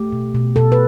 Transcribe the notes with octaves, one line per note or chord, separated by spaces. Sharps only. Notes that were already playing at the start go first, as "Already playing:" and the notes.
Already playing: A3 G4
B2
B2
B2 A4
B4